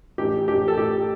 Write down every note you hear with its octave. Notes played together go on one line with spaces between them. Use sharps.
A1 G4
A1 G4
A4
A2 G4